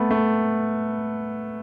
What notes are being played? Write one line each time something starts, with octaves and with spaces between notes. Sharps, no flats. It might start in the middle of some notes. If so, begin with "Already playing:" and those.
Already playing: A3 B3
A3